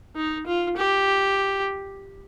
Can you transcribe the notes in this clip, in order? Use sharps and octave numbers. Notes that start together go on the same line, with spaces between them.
D#4
F4
G4